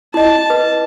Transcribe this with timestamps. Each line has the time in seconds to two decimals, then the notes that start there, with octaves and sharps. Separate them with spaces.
0.14 E4 D#5 A5
0.50 B4